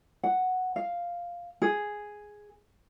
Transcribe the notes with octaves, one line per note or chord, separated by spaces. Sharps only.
F#5
F5
G#4